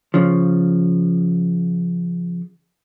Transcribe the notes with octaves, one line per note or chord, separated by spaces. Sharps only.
C#3 F3